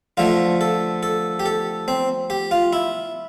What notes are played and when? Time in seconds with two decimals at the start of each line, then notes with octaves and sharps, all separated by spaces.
0.17 D3 F3 A3 F4
0.61 A4
1.03 A4
1.40 G4
1.46 A4
1.88 C4
2.30 G4
2.51 F4
2.73 E4